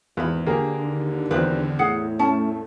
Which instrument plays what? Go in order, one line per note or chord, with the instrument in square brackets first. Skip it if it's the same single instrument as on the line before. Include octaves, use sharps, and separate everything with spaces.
[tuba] G#1 [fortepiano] E2 [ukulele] B4 B5
[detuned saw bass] D3 [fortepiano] A#3 G4 G#4
[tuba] D#2
[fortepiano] E2 G3 C4 [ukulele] G4 B4
[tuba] A2 [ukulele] G#4 F#5
[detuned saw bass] A3 [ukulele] C#4 A5